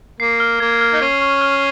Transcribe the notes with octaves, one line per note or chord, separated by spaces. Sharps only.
A#3 C7
F6
A#3 G#6
F6
D#4
C#4 C7
C#6
F6